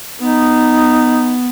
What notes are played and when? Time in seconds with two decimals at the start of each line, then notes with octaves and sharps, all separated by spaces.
0.20 B3 D#4